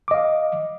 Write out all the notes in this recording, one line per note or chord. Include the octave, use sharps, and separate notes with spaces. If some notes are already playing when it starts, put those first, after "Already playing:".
D#5 F5 D6